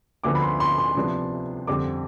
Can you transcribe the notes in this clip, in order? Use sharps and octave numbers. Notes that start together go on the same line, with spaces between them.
D2 D3 F3 B3 D6
B5
C6
C6
C6
C2 C3 F3 B3 D4
F2 D3 G3 C4 D6